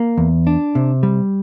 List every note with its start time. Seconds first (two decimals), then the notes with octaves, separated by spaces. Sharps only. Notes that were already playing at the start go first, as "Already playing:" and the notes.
Already playing: A#3
0.18 E2
0.47 D4
0.75 C3
1.03 G3